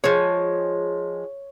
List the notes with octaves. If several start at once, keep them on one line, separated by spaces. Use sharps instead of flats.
F3 G#3 C#5